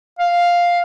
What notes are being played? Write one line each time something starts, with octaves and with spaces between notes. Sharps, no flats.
F5